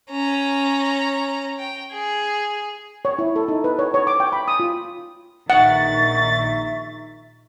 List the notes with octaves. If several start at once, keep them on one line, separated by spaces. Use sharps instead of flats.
C#4 A#5
G5
G#4
C#5
E4
A4
D#4
B4
C#5
C#5
D6
G5
B5
D#6
F4
A#1 D#3 E5 F#5 C#6 A6